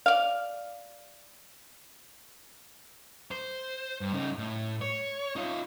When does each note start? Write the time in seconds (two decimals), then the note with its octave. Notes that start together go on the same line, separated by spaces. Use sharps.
0.06 D5 F5
3.31 C5
4.01 G2
4.13 C#3 D#4
4.38 A2
4.81 C#5
5.36 D#4 F4